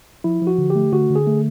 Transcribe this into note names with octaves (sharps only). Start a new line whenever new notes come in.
F3 E4
F3
F#4
D3
G4
A3
D3 F#4
D3
G#4
A3